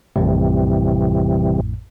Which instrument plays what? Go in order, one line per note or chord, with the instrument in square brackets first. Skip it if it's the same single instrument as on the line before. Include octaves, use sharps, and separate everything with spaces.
[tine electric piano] A1 F2 A2 [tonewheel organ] C3 E3 G3